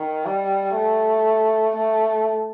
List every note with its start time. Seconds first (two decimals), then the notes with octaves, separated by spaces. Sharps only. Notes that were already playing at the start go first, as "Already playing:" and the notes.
Already playing: D#3
0.25 G3
0.76 A3
1.76 A3